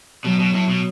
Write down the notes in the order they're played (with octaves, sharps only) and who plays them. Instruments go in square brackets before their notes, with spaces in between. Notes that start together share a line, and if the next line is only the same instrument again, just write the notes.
[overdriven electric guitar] B2 [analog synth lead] F#3
[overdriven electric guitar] B2
A2
B2